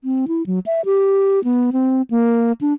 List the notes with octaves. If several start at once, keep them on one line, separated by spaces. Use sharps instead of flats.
C4
E4
F#3
E5
G4
B3
C4
A#3
D4